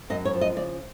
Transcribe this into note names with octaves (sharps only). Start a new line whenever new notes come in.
F#2 D#5
C#5
F3
D#5
C#3 D5